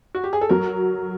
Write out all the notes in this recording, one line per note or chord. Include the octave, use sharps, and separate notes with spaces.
F#4
G4
G#4
A4
F#3 A#4